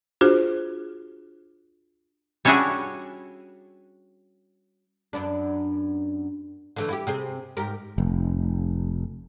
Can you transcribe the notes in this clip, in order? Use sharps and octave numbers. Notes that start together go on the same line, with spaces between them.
D4 F4 F#4 G#4 C5
G3 C#4 D4 E4 F#4 G#4
F#2 B3 D4
D3 E3 A3
E4 F#4 G4
C3 C4 G#4
G#2 G4 A#4
F1